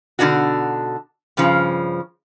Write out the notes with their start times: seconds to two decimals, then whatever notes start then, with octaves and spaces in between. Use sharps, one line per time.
0.19 B2 D3 D4 D#4 F#4
1.37 G2 C#3 F3